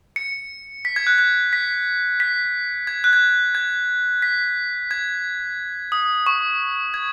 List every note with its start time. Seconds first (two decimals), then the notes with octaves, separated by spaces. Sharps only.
0.16 C#7
0.85 B6
0.96 G#6
1.07 F#6
1.18 G#6
1.53 B6
2.20 B6
2.87 G#6
3.04 F#6
3.13 G#6
3.55 G#6
4.22 B6
4.91 G#6
5.92 D#6
6.27 C#6
6.94 G#6